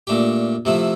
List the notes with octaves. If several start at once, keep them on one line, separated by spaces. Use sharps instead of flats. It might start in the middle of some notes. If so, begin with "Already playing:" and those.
A#2 A3 D4 G4
C3 F3 A3 E4